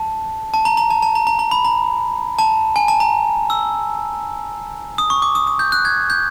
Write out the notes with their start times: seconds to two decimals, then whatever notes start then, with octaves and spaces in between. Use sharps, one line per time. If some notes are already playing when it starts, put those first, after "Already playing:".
Already playing: A5
0.54 A5
0.65 A#5
0.77 A#5
0.90 A5
1.02 A5
1.15 A#5
1.27 A#5
1.39 A#5
1.51 B5
1.65 A#5
2.39 A5
2.76 G#5
2.88 A5
3.00 A#5
3.50 E6
4.98 D#6
5.10 C#6
5.22 D6
5.35 D#6
5.47 D#6
5.59 G6
5.72 F#6
5.85 G#6
6.10 G6